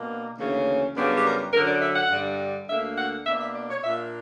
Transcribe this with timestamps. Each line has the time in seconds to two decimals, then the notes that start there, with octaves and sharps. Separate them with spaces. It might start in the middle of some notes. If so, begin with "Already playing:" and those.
Already playing: B2 A#3 D4
0.38 D2 C#3 E3 A#3 C#4
0.95 F#2 C#3 G3 B3 D4
1.18 G4
1.24 A#4
1.53 F#2 D3 F#3 A#4
1.67 D5
1.82 E5
1.96 F#5
2.10 G2 D3 G3
2.68 D2 D3 A#3 E5
2.98 F#5
3.26 B2 A#3 D4 E5
3.41 E5
3.54 D5
3.70 C#5
3.83 A#2 A#3 D4 E5